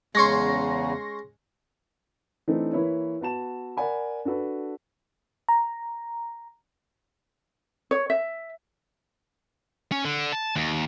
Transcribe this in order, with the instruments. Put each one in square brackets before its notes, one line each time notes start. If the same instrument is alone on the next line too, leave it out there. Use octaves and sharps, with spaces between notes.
[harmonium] E2 C#3 [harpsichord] G#3 C#4 [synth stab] C6 C#6 A#6
[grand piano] E3 A3 C4 D4 D#4
E3 A#3 E4 A#4 B4 C#5
B3 F#4 A5 E7
A#4 D5 F#5 G#5 B5
D4 F#4 A4 B4
[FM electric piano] A#5
[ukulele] C#5
E5
[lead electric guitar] C#4
D3
A5
D#2